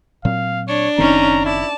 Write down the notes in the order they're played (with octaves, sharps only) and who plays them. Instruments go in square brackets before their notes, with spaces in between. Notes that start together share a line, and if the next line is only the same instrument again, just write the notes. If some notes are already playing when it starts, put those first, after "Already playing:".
[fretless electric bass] A#2 F#3 C4 [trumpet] F5
[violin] D4 [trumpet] C#5
[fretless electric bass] F#1 D#3 C4 [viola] C#4 D#4 [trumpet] A#5
[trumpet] E4 [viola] D5 A5